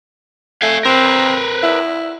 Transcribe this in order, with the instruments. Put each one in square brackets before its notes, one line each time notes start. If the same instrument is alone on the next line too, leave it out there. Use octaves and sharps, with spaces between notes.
[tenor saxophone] A3 [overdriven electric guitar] F5 G#5
[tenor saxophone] C4 [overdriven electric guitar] A#4 B4
[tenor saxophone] E4